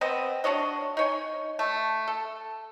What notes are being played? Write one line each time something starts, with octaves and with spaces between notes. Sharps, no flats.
B3 C4 D#5
D4 F#4 C#5 D#5
D#4 C#5 G#5
A3
A4